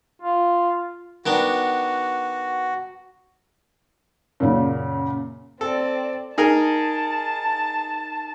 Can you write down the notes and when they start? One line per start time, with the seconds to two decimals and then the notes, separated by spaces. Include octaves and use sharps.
0.22 F4
1.26 D#3 B3 D4 F#4
4.40 F#2 A#2 C#3
5.61 C4 A4 D5
6.38 D#4 G#4 A#4 A5